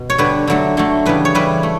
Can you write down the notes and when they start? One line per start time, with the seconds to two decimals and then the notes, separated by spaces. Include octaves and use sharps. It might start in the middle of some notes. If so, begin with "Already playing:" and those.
Already playing: B2
0.10 C#5
0.18 D3 G3 B4
0.47 D3 F#3 A3
0.77 D3 F#3 A3
1.05 C#3 E3 G3 B4
1.25 C#5
1.35 C#3 E3 G3 B4
1.63 A3